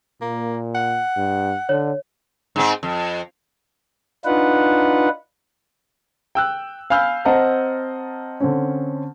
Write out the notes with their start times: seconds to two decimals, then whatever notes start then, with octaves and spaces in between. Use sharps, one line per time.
0.22 A#2 A#3
0.75 F#5
1.17 G2
1.69 D3 C#5
2.56 G#2 C4
2.83 F2
4.25 D4 D#4 F4 B4 F#5
6.35 G5 E6 F#6
6.90 F5 G#5 B5 E6 F6 G6
7.25 C4 C5 D#5 F#5 A5 A#5
8.40 D3 C4 C#4